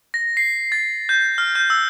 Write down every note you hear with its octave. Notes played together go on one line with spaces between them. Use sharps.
A#6
C7
A6
G6
F6
G6
E6